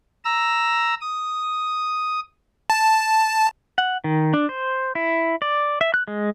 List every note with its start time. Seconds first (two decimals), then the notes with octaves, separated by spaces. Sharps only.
0.25 A#5 E6
1.01 D#6
2.70 A5
3.78 F#5
4.04 D#3
4.34 D4
4.49 C5
4.95 E4
5.42 D5
5.81 E5
5.94 F#6
6.08 G#3